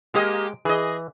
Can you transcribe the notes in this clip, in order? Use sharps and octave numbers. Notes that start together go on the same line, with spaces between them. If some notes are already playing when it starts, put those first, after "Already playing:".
G#3 A#3 G4 D#5
E3 G#4 D#5